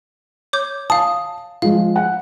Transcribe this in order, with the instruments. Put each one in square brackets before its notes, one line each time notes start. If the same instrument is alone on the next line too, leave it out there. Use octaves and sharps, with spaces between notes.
[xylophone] C#5 D6 G6
[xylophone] F5 D#6 [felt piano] A5
[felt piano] F3 G#3 F4 [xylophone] F5
[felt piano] F#5